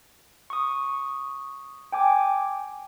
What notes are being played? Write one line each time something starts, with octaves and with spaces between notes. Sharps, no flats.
C#6 D#6
G5 G#5 D6